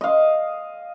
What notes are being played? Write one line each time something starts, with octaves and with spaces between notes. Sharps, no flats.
D#5 F5